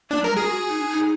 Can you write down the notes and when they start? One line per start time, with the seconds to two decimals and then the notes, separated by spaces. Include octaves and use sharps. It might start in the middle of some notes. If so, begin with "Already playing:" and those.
0.10 A#3 D4
0.20 F#3 A#4
0.30 G#3
0.37 F#4 G#4
0.49 F#4
0.69 D#4
0.79 D4
0.89 D#4